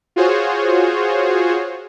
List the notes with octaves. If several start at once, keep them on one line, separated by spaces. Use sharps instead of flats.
F4 F#4 G#4 C5 C#5